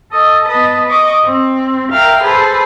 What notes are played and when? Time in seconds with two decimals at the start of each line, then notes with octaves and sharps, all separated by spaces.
0.11 A4 D#5
0.47 B3 B4 D#5 A5
0.89 D#5 C#6 D6
1.24 C4
1.91 A#4 E5 F5 G5 F6
2.23 G#4 A4 B4 C5